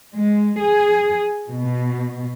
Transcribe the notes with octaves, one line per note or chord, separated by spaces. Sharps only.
G#3
G#4
B2